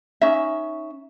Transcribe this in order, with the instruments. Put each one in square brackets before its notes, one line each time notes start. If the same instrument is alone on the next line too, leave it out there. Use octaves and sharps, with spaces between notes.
[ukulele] C#4 D#4 E5